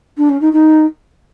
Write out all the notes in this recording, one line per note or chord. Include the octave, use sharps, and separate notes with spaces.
D4
C#4
D#4
D#4